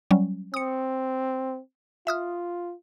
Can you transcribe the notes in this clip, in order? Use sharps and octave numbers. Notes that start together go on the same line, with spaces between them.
F#3 G3 C#4
C4 D#6 C#7
F4 E5 D#6 F6